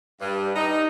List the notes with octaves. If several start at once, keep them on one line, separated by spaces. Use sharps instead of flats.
G2
D#4